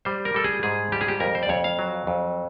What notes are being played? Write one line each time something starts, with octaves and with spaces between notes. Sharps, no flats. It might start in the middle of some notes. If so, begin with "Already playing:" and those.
G3 C5
A#4
G3 A4
G#4
G#2 G#4
G3 G4
G#4
G4
F2 A#4
C5
D5
F2 C#5
F5
F#3
F2